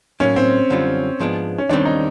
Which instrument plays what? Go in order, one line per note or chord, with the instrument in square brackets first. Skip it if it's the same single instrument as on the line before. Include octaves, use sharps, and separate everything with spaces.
[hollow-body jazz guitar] A2 F#3 A#3 [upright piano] C#4
[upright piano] C4
[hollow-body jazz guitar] F#2 D3 G3 C4 F4
G#2 F3 G#3 B3 D4
[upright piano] C#4
[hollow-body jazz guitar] D#2 D#3 G3 C4 [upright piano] D4
[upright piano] D#4